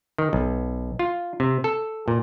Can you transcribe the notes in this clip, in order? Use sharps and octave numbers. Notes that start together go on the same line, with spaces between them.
D#3
B1
F4
C3
A4
A#2